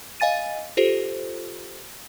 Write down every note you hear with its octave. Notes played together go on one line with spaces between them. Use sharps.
D#5 F5 G#5 A6 D#7
F4 G4 A4 C5